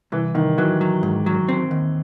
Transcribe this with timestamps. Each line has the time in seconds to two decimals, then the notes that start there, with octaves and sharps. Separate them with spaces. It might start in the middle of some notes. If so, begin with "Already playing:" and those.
0.12 C2 E3
0.35 C2 D#3
0.58 E3 F#3
0.81 F#3
1.03 G#2
1.26 F#3
1.49 C4
1.71 D#2